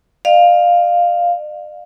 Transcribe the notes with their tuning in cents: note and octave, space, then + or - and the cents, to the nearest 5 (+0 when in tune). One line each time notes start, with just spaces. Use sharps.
D5 +45 F5 +0